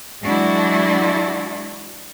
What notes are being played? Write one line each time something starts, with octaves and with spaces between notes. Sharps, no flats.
E3 F#3 G#3 D4 E4 F#4